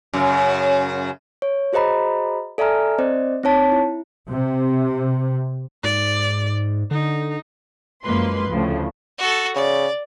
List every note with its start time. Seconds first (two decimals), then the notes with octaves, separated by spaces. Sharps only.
0.14 F#2 C#3
1.42 C#5
1.73 F#4 G#4 C5 D#5 A#5 B5
2.58 A4 D5 E5 G#5 A#5 F6
2.98 C4 C5 D5 D#5
3.43 C4 D#4 C#5 A5 B6
3.72 E4
4.29 C3
5.84 G#2 D5
6.91 D3 D#4
8.04 F#2 F3 G#3 A#3 B4 C6
8.50 D2 A2 C#3 F3
9.18 F#4 A4
9.56 C#3 D5